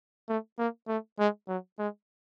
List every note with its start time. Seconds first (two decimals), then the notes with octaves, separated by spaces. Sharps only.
0.29 A3
0.59 A#3
0.88 A3
1.19 G#3
1.48 F#3
1.79 G#3